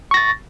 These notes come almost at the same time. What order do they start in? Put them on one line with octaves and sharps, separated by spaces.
C#6 A#6 A6